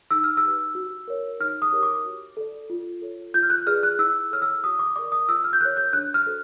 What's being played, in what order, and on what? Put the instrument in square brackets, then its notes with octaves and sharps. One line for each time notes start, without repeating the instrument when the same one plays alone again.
[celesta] D#4 E6
F6
E6
G4 B4
F#4
A#4 C#5
D#4 F6
D#6
G4 A#4 C#5
D6
F#4
A4 D5
F4
A4 C#5
F4 G6
F6
F#6
G#4 B4 D5 F6
F#6
E4 E6
A4 C#5 F6
E6
F#4 D#6
D6
A#4 D5 D6
D#6
F4 E6
F6
G6
A#4 C#5 F#6
G6
D4 F#6
F6
F#4 A4 C5